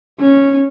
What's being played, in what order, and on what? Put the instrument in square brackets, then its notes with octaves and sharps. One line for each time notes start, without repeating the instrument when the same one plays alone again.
[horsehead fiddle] C#4